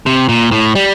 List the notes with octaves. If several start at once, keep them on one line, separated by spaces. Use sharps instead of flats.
C3
A#2
A2
G3